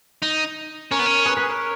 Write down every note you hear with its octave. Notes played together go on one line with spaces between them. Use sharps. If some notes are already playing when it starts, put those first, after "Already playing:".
D#4
C#4 A#4 C#5
B3
C#4
G#4 B4
G#4 B4
A#4 C#5